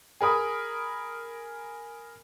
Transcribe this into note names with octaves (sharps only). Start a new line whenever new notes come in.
G#4 A#4 B5 D#6